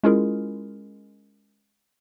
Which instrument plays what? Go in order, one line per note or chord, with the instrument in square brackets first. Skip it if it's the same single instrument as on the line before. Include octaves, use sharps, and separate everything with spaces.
[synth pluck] G#3 C#4 E4 F4 G#4 A#4